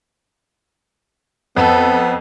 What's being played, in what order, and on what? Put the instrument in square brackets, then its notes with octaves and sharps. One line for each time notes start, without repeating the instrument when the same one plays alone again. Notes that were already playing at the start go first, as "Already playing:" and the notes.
[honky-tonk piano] F2 [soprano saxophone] B3 [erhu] A4